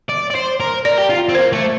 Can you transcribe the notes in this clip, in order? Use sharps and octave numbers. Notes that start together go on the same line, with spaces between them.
D5
D5
C5
A#4
A#4 D5
G4
F4
C4
A#3 C5
A3